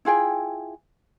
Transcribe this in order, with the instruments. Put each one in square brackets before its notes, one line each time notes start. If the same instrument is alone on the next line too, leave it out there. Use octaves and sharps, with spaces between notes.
[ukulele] E4 F4 G#4 G5